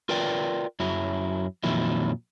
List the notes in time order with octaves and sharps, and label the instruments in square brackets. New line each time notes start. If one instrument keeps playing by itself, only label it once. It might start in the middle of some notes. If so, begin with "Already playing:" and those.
[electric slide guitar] F4 A#4 B4 D5 G5
F#2 F#3 E4
F2 A#2 D#3 F#3 E4